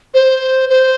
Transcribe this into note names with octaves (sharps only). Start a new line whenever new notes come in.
C5
C5